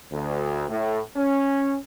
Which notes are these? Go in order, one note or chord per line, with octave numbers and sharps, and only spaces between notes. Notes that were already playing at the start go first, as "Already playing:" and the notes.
D2
A2
C#4